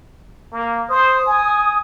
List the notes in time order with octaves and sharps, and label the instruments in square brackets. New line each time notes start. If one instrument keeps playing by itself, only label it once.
[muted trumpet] A#3
[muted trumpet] C5 [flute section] D#6
[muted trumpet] G#5